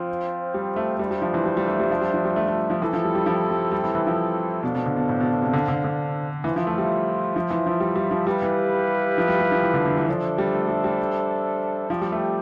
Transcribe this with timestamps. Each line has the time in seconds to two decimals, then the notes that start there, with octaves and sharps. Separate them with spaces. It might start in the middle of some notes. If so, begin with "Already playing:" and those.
Already playing: F3 C4 F4 C5 F5
0.54 G3
0.76 A3
0.99 G3 D4 F4 C5 E5
1.11 G3
1.22 F3
1.34 E3
1.45 G3
1.57 G3
1.67 A3
1.80 G3
1.90 F3
2.01 G3
2.14 F3
2.25 G3
2.36 A3
2.48 A3
2.70 F3
2.82 E3 C4 E4 A4
2.93 F3
3.04 G3
3.15 G3
3.26 F3
3.50 G3
3.72 G3
3.84 E3
3.95 E3
4.07 F3
4.63 B2 D4 A4 C5 F5
4.75 B2
4.86 D3
4.96 B2
5.09 A2
5.20 B2
5.31 B2
5.42 C3
5.54 D3
5.68 D3
5.84 D3
6.44 E3 F4 C5 E5
6.56 F3
6.67 A3
6.78 G3
7.36 F3
7.50 E3
7.66 F3
7.80 G3
7.96 G3
8.11 F3
8.27 G3 E4 G4 B4 F5
8.42 E3
9.18 F3
9.28 G3
9.39 G3
9.52 F3
9.63 E3
9.74 D3
9.85 D3
9.97 E3
10.08 F3 D4 A4 C5 E5
10.38 G3
10.53 A3
10.68 G3
10.84 G3
11.89 F3 C4 G4 D5 G5
12.02 G3
12.12 A3